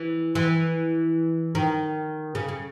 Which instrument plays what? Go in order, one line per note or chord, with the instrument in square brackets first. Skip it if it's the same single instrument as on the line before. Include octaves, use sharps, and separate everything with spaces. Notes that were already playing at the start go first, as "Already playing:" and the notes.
Already playing: [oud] E3
E3
D#3
C#3
C#3